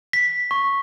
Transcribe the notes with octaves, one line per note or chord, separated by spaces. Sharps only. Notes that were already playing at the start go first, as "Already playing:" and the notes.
B6
C#6